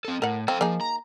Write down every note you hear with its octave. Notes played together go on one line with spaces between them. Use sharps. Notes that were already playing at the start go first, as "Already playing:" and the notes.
C4 A4
A2 A#4 F#5
C4 A4 F5
F3 A#3 D#4 G#4
A#5